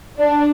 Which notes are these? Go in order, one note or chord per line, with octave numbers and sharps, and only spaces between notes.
D4